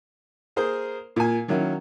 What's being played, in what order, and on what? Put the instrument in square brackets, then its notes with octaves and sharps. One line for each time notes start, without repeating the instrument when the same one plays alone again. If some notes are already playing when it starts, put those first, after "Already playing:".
[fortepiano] A#3 G#4 A#4 C5
A#2 G#5
D#3 F#3 A#3 C#4 E4